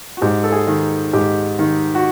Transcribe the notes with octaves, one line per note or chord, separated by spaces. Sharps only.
F#4
G#2 G4
A4
G#4
D#3
G#2 G4
D#3
F#4